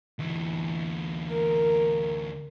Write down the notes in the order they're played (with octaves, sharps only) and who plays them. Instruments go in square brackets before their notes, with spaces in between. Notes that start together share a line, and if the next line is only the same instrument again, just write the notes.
[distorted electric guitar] D2 E3
[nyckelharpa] A#4